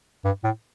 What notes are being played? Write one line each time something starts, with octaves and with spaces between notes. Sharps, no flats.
G2
A2